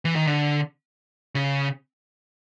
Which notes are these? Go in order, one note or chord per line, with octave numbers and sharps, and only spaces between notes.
E3
D#3
D3
C#3